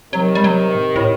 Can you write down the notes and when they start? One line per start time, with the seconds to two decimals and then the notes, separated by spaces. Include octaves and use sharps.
0.13 C3 D#3 F#3
0.35 G3
0.44 F#3
0.75 A2
0.96 A2